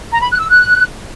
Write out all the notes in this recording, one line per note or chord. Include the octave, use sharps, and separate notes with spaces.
A#5
B5
F#6
E6
F#6